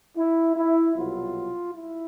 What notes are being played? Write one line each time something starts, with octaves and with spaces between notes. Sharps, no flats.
E4
E4
C2 B2 F#3 F4
E4